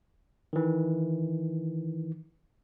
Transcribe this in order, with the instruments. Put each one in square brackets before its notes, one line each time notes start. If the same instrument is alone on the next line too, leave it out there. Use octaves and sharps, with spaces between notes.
[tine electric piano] D#3 E3